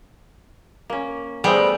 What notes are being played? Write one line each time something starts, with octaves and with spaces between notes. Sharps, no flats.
A#3 C#4
G3 A3 B3 G#4 C5